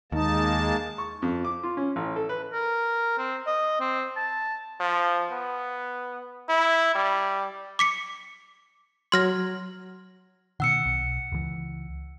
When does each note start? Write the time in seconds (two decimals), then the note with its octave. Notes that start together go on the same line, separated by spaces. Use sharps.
0.12 D#2 G#3 A#3 D#4 A5
0.98 C#6
1.22 F2
1.45 D6
1.63 F4
1.77 C#4
1.96 A1
2.16 A4
2.29 B4
2.53 A#4
3.18 C4
3.47 D#5
3.81 C4
4.16 A5
4.80 F3
5.31 B3
6.49 E4
6.95 G3
7.79 D6 B6 C#7
9.12 F#3 C6 F6 G#6 A#6
10.60 B2 D#3 F#5 E6 C#7
10.85 B1
11.32 C#2 E3